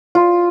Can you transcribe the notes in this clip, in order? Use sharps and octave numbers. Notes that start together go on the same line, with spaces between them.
F4